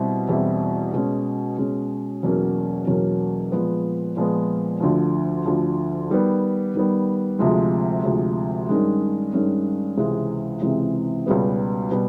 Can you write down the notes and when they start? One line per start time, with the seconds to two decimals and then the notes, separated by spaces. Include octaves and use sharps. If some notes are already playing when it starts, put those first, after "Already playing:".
Already playing: B2 G3 C4 E4
0.29 E2 B2 G3 C4 E4
0.93 B2 G#3 C#4
1.58 B2 G#3 C#4
2.23 E2 B2 F#3 A#3 C#4
2.87 E2 B2 F#3 A#3 C#4
3.52 A#2 F3 G#3 B3
4.16 A#2 F3 G#3 B3
4.80 D2 D3 F3
5.46 D2 D3 F3
6.10 D#3 G3 B3
6.75 D#3 G3 B3
7.39 D2 C3 F3 G#3
8.03 D2 C3 F3 G#3
8.69 G2 D#3 G#3 C#4
9.33 G2 D#3 G#3 C#4
9.98 C#2 C3 E3 G#3 C4
10.62 C#2 C3 E3 G#3 C4
11.26 C#2 B2 G3 B3
11.91 B2 G3 B3